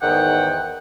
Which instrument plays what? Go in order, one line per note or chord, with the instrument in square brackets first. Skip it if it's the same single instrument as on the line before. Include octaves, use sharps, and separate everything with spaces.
[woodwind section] E2 G#2 D#3 F#5 G5